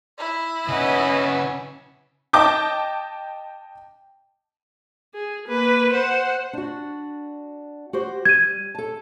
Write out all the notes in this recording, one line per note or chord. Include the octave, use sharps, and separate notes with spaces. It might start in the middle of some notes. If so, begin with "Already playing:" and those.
E4
C#3 C#4 B4 D#5 F#5
D#5 G5 A5 D6 G6
G#4
A#3 B4
C5 F#5
D4 F#4
F#4 G4 C5
G3 G#6 D#7
A4 A5